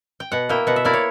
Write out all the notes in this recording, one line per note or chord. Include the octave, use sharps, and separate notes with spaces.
G5
B2 F#5
A#3 E4 G5
B2 F#5
E5
A#3 E4 D5
C#5